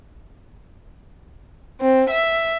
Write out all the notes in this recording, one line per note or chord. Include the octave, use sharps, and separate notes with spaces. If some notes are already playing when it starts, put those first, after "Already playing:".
C4
E5